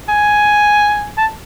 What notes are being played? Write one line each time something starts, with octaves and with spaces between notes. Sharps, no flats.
G#5
A5